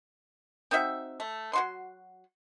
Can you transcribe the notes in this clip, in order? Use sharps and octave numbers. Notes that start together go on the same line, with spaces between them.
C4 D#4 F#4 E5
A3
F#3 F#4 C6